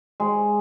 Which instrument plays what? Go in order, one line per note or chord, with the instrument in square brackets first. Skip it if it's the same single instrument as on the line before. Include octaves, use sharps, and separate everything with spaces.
[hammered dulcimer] G#3